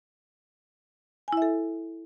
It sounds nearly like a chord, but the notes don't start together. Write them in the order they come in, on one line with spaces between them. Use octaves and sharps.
G#5 E4 E5 A4